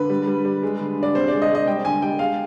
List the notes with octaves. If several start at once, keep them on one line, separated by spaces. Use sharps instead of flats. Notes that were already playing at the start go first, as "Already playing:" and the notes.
Already playing: D3 B4
G3
G3
G3
G#3
D3
D3
D5
C3 C5
D5
G#3
D#5
G#3
D#5
G3 G5
D3 G#5
G3 G5
G#3 F5